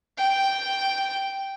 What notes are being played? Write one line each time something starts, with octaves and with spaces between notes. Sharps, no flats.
G5